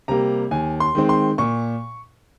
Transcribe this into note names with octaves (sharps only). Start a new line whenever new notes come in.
C3 G3 A#3 A#5
D#2 G#5
C6
D#3 G#3 C4
C6
A#2 C#6